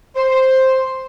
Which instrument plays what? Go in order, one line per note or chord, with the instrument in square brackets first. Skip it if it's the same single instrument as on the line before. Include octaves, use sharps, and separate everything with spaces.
[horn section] C5